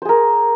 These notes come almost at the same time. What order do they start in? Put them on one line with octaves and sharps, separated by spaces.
C5 G#4 A#4